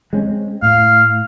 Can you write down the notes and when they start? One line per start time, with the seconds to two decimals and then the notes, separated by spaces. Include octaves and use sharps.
0.13 G#3 C4 C#4
0.62 A2 F5